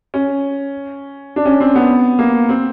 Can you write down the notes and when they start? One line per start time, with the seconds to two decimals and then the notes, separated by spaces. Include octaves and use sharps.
0.14 C#4
1.36 D4
1.45 C#4
1.60 C4
1.76 B3
2.19 A#3
2.49 C4